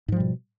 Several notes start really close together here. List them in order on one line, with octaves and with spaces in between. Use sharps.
G#2 F3 G3 B2